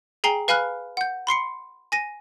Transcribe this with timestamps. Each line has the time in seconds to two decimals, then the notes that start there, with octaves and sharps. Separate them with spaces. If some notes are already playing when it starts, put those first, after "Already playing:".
0.24 G#4 G5 G#5 A#5 C7 G7
0.48 B4 F5 G#5 B5 F6 F#6
0.97 F#5 G6
1.27 B5 C6 C7 C#7
1.92 G#5 A#6 D#7